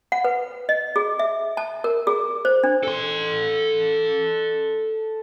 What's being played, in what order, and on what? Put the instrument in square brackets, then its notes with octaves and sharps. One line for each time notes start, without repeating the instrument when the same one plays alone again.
[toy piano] F#5
B4
D#5
G#4
E5
A5
A#4
G#4
C5
D4
[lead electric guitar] A4 C6